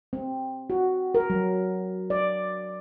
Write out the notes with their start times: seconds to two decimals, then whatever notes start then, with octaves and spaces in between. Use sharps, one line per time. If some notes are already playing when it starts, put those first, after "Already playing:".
0.13 C4
0.70 F#4
1.15 A#4
1.30 F#3
2.10 D5